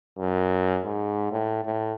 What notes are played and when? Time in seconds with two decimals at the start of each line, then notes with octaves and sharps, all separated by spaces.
0.19 F#2
0.86 G#2
1.32 A2
1.65 A2